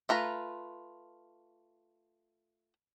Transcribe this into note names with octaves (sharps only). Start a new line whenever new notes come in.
A3 F4 B4 A#5